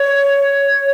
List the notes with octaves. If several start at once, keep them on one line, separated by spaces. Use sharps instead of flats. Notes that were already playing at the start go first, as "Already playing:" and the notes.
Already playing: C#5